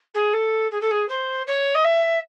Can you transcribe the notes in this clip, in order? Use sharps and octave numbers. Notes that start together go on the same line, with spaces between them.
G#4
A4
G#4
A4
G#4
C5
C#5
D#5
E5